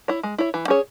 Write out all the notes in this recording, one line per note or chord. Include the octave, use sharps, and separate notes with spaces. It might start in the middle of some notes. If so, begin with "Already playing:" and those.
E4 C#5
G#3
E4 C#5
E3
C#4 G#4 C#5